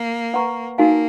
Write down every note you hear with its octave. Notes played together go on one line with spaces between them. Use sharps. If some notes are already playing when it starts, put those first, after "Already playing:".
Already playing: A#3
B4 F#5 A#5 C#6
A#3 D#4 F#4 A#4 F5 G#5